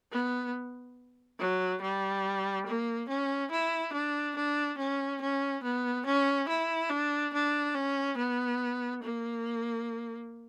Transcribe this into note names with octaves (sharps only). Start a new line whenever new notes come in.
B3
F#3
G3
A#3
C#4
E4
D4
D4
C#4
C#4
B3
C#4
E4
D4
D4
C#4
B3
A#3